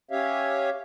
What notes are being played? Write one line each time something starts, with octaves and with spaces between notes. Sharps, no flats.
C#4 G4 C#5 E5 F5